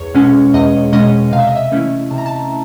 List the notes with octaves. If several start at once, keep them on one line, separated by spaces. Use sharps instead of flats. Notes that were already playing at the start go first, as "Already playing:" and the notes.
Already playing: E2 C#5
B2 G#3 C#4
E2 D#5
B2 G#3 C#4 D#5
C3 F5
E5
D#5
E5
E3 A3 C#4 E4
C3 A5
A#5
A5